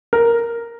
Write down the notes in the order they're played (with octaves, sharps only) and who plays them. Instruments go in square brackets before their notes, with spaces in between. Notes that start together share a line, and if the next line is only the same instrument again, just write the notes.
[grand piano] A#4